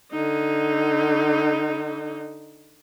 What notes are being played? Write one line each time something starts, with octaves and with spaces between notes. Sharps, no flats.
D3 D#4